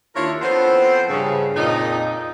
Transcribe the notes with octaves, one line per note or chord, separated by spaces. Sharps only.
D#2 D4 E4 F4 A#4 C#5
F3 B3 C4 A4 C5
G2 C#3
F2 A#2 D#4